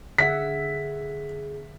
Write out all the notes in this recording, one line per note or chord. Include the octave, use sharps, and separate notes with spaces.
D3 G#4 E5 F#5 B6